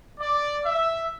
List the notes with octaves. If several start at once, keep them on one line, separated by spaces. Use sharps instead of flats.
D5
E5